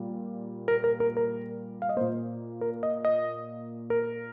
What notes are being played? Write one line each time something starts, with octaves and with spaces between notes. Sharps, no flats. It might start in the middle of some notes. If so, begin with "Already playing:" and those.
Already playing: A#2 G3 A#3
A#4
A#4
A#4
A#4
F5
D#5
A#2 A#3 C5
A#4
D#5
D#5
A#4